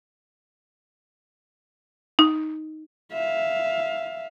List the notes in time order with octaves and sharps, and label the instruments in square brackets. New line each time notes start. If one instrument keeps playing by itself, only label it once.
[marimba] D#4
[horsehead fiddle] E5 F5